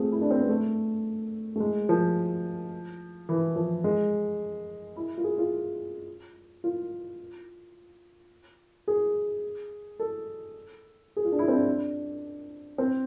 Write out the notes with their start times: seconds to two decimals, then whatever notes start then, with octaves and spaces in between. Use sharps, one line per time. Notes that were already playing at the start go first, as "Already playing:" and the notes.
Already playing: A3 C4 F4 G#4
0.12 E4
0.21 D4
0.31 C4
0.40 B3
0.49 A3
1.56 A3
1.60 G#3
1.89 F3
3.29 E3
3.56 F3
3.84 G#3
4.96 E4
5.18 F4
5.24 G#4
5.38 F4
6.64 F4
8.88 G#4
9.99 A4
11.16 G#4
11.25 F4
11.32 D4
11.39 E4
11.48 C4
11.53 D4
12.78 C4